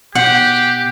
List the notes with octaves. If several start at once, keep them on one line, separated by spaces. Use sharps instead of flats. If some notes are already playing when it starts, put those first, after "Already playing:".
B2 G4 F#5 C7